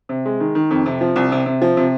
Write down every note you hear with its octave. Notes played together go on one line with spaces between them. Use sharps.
C3
G#3
D#3
D#3
F2
C3
F3
C2
C3
C3
F3
C3